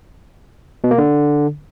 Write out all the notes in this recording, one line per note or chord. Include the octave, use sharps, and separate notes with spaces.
B2
A#3
D3